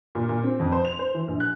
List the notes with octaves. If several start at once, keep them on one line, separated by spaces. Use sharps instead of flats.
A#2
A#2
C4
F2
C5
F7
C5
E3
A#1
F#6